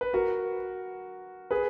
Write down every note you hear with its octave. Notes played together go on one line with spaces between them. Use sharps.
B4
F#4 A#4
G#4 B4